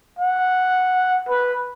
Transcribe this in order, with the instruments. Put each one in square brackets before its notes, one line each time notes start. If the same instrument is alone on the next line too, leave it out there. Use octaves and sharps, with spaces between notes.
[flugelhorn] F#5
B4